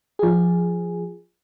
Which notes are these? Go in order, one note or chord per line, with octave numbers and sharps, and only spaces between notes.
F3 G#4